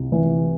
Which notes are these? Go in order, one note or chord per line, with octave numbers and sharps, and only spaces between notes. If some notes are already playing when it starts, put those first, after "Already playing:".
Already playing: C2 C3
E3